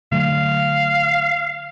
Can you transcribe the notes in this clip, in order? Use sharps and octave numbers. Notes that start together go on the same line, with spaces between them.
D3 F#3 A3 F5